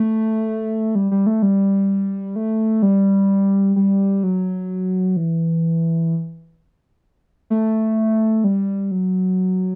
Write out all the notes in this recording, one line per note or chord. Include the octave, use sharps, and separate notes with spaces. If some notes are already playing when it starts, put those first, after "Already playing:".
Already playing: A3
G3
G3
A3
G3
A3
G3
G3
F#3
E3
A3
G3
F#3